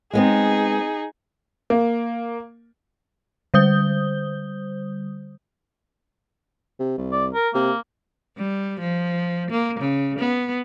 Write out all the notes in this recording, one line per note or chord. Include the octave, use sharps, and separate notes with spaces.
G#3 B3 C4 D#4 G#4
A#3
D3 G3 C5 D#6 G6 G7
C3
C2
D5
A#4
C3 A#3
G3
F3
A#3
C#3
B3